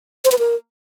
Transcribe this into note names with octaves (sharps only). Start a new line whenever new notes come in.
C5
B4
A#4